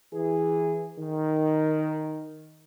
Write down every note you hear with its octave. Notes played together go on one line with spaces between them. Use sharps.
E3 G#4
D#3